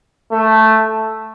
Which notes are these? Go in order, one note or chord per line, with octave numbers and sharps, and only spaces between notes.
A3